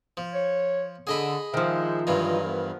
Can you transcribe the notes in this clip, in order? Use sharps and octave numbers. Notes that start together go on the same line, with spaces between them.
F3
C#5
D3 G#4 D#5 B5
D#3 F3 G#3 C5 E5
G2 E3 F#3 F4 D#5
F3 B3 A#4